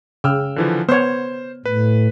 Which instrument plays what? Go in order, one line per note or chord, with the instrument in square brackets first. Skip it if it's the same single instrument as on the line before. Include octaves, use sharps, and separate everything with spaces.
[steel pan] C#3 [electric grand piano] G5 E6 F6
[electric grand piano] D3 E3 F3
[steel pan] B3 C#5 [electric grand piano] C5
[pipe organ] A2 [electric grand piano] B4